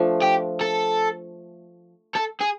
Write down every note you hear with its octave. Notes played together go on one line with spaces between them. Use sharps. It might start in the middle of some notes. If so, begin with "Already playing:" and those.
Already playing: F3 A3 D4
G4
A4
A4
G#4